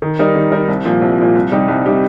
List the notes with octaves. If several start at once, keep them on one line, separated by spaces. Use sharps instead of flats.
D#3
G3 D#4 A#4
D#3
G3 D#4 A#4
C2
A#2 F3
C2
A#2 F3
C2
C3 G3 D#4 G4
C2
C3 G3 D#4 G4